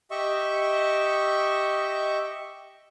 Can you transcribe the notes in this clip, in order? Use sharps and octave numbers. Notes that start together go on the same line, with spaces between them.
G4 D#5 E5 C#6